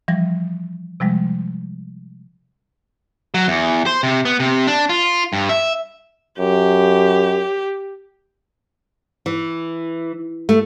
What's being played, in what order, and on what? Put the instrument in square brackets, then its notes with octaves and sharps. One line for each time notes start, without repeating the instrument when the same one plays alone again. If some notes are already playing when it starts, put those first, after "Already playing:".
[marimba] E3 F3 G3 A#6
C3 F3 G3 G#3
[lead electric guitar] F#3
E2
C5
C3
B3
C3
D4
F4
G2
E5
[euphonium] F#2 [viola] G4
[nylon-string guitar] E3
A3